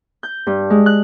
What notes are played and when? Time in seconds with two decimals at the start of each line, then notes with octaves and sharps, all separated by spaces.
0.23 G6
0.47 G2
0.70 G#3
0.86 F#6